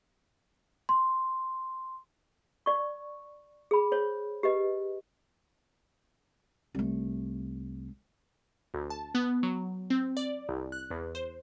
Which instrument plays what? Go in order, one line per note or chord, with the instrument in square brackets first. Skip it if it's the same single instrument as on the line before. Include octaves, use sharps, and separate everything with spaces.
[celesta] C6
[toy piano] D5 C#6
G#4 B5
C5 C#5
G4 B4 D#5
[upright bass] C2 A3
[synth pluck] D2
A5
B3
F#3
C4
D5
C2
F#6
E2
C5